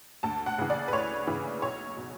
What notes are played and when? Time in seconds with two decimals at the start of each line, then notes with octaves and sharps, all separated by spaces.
0.23 D2 A5
0.46 F#5
0.58 C#3 E3
0.70 D5
0.88 B4
0.92 D2 C#5
1.27 C#3 E3
1.62 B1 C#5
1.97 B2